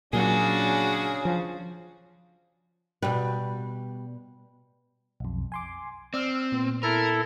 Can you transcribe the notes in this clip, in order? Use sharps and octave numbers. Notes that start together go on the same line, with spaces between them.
A#2 C#3 F#3 C#4 D4 F#4 G#4
F3
B2 G3 B4
B1 F2
G#5 C6 D6
C4 D5 E6 F6
A#2 B3
E4 A4 A#4